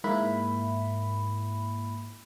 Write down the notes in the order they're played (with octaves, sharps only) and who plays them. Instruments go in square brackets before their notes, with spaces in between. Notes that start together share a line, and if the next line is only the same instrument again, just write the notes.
[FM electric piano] G#2 A#3 E4 B5